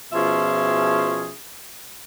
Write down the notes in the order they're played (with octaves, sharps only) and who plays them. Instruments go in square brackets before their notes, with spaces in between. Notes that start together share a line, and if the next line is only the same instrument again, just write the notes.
[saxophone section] B2 F3 C#4 F4 G#4 E5